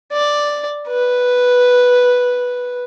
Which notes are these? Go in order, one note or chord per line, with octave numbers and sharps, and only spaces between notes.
D5
B4